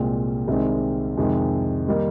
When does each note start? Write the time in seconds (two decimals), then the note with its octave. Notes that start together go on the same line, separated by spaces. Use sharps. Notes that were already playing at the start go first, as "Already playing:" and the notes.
Already playing: C2 A#2 G#3 C4
0.47 C2 C3 D#3 G#3 C4
1.17 F2 C3 D#3 G#3
1.87 D#3 G3 A#3 D#4